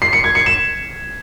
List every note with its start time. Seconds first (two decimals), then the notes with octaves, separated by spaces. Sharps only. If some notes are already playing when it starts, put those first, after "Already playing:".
0.02 C7
0.13 C#7
0.24 G#6
0.35 C#7
0.46 E7